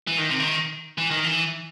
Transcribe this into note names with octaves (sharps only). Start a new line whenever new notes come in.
E3
D#3
C3
D#3
E3
D#3
E3